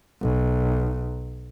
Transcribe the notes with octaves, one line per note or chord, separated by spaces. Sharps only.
B1